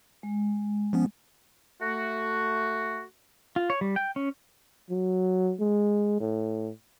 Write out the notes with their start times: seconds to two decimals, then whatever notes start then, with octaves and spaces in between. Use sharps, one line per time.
0.23 G#3
0.93 F3 B3 C#4
1.81 A3 F#4
3.56 F4
3.70 C#5
3.81 G3
3.96 G5
4.16 C#4
4.90 F#3
5.60 G#3
6.20 A2